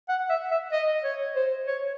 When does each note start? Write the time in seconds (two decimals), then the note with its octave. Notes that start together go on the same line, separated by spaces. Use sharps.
0.09 F#5
0.29 E5
0.51 E5
0.72 D#5
1.04 C#5
1.36 C5
1.67 C#5